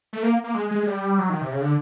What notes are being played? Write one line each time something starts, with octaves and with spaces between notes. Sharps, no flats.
A3
A#3
A#3
G#3
G#3
G#3
G3
F#3
D#3
C3
C#3
D3